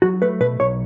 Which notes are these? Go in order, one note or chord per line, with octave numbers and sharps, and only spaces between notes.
F#3 F#4
A3 B4
B2 B4
B1 C#5